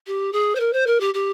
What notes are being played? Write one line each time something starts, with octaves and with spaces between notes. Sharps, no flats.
G4
G#4
C5
A#4
C5
A#4
G4
G4